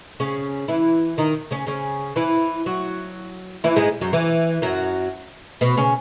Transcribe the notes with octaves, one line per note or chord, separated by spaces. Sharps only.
C#3 C#4
E3 E4
D#3 D#4
C#3 C#4
C#3 C#4
E3 E4
F#3 F#4
E3 E4
G#2 G#3
F#2 F#3
E3
F#2 F#3
B2 B3
C#3 C#4